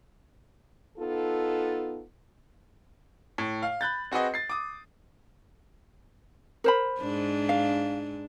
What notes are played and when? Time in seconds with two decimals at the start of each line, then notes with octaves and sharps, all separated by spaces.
0.98 B3 D#4 F4 A4
3.38 A2
3.63 F5
3.81 B5 F#6 G6 A6
4.12 C4 F#4 G#4 B4 D#5
4.34 A6 C7
4.50 D6 D#6
6.64 A#4 C5 B5
6.99 G#2 D4
7.49 F5